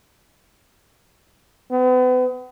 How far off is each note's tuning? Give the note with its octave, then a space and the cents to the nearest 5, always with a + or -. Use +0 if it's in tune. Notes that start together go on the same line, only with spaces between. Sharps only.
B3 +40